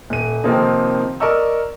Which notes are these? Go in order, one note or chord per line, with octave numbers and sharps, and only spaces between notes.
D#1 D#7
C3 D#3 F3 A#3 C4 D#4
A#4 D5 D#5 C#6 E6